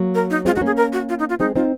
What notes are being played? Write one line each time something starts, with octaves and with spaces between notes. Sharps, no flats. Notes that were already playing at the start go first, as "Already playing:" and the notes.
Already playing: F#3 A#3
A#4
D#4
G#3 C4 F4
D#4 F#4
A#3 C#4 G#4
A#4
F#4
F4
D#4
F4
G#3 C4 D#4
C4 D#4 F4